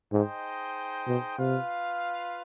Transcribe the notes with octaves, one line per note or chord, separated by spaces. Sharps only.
G#2 D#4 G#4 C5 D#5 G5
B2
C3 F4 B4 F5